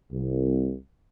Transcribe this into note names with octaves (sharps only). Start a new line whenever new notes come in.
C2